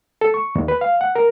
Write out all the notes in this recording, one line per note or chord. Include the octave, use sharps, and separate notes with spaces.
A4
C#6
D#2
B4
F5
F#5
A#4